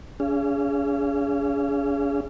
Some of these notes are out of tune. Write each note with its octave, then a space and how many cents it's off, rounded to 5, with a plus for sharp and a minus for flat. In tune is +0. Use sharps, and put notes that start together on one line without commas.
C#4 +45 G#4 +0 F5 -35